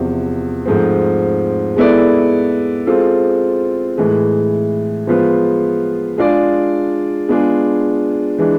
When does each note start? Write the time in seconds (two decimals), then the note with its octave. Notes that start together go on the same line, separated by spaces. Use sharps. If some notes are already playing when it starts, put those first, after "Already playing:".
Already playing: E2 C3 F3
0.66 G#2 F3 A3 C4
1.76 G#3 B3 E4 A4 D5
2.87 G#3 C4 F4 A4
3.97 A2 E3 G#3
5.07 F3 G#3 B3 F4
6.17 G#3 D4 F4 G#4 D5
7.29 G#3 B3 D4 F4 G#4
8.39 E3 G#3 D4